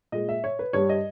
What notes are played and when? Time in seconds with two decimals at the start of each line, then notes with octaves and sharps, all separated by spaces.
0.12 A#2 G#3 D#5
0.29 E5
0.44 C#5
0.59 B4
0.73 G2 G3 C#5
0.89 D#5